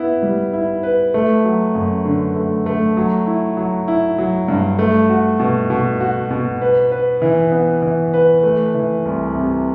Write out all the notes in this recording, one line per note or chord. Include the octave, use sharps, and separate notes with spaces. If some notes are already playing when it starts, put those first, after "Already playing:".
Already playing: B3 E4
G3
E4
B4
A3
F#3
F#2
D3
A3
A3
F#3
E4
F#3
E4
F#3
G2
A3
F#4
B2
B2
F#4
B2
B4
B4
E3
B3
E3
B4
A3
E3
C2
C3